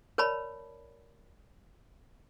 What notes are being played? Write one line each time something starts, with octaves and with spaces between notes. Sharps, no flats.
A#4 C#5 D5 A5 B5